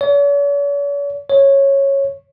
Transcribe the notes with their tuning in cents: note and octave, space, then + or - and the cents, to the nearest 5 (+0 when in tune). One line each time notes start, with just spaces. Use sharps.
C#5 +45
C#5 -10